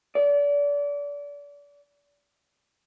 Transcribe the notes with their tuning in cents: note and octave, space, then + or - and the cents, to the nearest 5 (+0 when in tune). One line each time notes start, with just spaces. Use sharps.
D5 -30